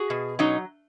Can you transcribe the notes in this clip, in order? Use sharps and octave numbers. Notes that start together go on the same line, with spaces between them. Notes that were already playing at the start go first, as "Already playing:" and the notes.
Already playing: F#4 G#4
B2
F#3 C#4 D#4